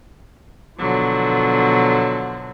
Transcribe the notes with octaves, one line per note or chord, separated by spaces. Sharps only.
B2 D3 F3 F#3